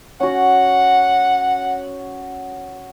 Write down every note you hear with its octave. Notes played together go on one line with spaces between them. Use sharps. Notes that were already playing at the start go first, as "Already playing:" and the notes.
C#4 F#4 F#5